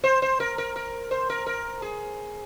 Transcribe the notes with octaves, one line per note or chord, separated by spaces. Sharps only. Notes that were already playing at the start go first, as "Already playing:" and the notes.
C5
C5
A#4
A#4
A#4
C5
A#4
A#4
G#4